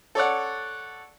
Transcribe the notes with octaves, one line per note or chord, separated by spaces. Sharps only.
A4 C#5 D5 F#5